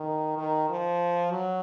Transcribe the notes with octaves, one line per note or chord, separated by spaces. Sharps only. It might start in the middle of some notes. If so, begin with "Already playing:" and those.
Already playing: D#3
D#3
F3
F#3